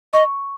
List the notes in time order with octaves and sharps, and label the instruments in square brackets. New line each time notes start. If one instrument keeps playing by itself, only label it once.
[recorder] D#5 [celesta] C#6